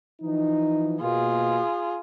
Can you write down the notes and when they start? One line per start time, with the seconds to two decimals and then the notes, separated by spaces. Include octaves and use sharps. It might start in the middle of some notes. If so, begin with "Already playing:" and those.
0.22 E3 F3 D#4
1.01 B2 A#3 F4 G#4